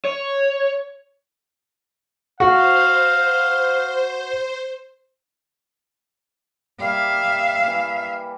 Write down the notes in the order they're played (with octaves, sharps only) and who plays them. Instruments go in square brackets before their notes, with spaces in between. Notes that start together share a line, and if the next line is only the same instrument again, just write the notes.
[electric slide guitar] C#5
[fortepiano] F#4 [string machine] C5 [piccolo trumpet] F5
[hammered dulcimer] G3 A#3 [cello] E5 F5
[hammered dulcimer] E3 A#3